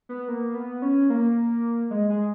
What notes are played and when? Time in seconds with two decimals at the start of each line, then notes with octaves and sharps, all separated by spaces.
0.09 B3
0.28 A#3
0.55 B3
0.82 C#4
1.10 A#3
1.91 G#3
2.10 G#3